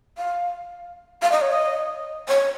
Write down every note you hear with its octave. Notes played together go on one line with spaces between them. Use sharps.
F5
F5
D#5
C#5
D#5
C#5